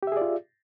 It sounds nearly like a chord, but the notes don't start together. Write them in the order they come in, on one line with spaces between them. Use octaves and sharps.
G4 E5 G#4 D5 F4